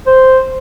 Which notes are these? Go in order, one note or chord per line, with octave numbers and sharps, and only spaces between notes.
C5